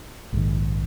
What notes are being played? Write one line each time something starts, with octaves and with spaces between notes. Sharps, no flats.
A#1 G#2 D#3